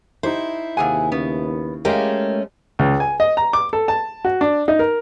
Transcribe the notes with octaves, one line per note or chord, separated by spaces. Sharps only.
D#4 E4 G4 C5
D#2 C3 G#4 F5 F#5 G#5
C#3 B3
G#3 A3 C#4 G4 A#4 D#5 F5
C#2
G#5
D#5
A#5
D6
A4
A5
F#4
D4
D#4
A#4